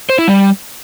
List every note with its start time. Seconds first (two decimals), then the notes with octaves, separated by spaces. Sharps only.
0.09 C5
0.19 E4
0.28 G3